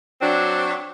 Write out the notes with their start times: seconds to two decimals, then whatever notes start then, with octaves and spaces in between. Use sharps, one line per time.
0.22 F#3 C4 D4